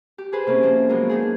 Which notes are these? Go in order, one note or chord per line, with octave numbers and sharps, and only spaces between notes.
G4
G#4 B4 C5
C3 A#3 C#4
F3 A#3
F#3 G#3 A#3 B3
D4 D#4 G#4